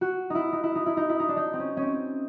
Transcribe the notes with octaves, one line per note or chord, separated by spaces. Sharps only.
F#4
D#4 E4
D#4
E4
D#4
E4
D#4
E4
D#4
D4
D#4
C4
C#4
C#4
C4